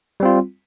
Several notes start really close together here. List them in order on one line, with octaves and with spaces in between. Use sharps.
G3 C4 F4